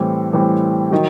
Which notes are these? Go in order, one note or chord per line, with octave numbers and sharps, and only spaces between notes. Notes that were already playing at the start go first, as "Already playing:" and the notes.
Already playing: A2 E3 G3 C4
A2 E3 G3 C4
D#3 F#3